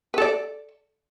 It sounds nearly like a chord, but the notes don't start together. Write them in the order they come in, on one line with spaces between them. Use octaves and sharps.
B4 A4 D5